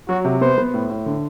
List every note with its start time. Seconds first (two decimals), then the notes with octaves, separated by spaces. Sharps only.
0.08 F#3 F#4
0.25 C3
0.41 B3 C5
0.58 B3
0.74 A2
0.90 A2
1.06 D3